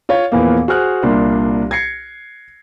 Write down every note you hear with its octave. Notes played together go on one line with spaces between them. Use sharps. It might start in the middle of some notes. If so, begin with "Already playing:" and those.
F4 C#5
E2 A#2 E3 F3 A#3
F#4 G#4 C5 F6 F#6
C2 A#2 D4 A#4 C6
G#6 A#6 C7 C#7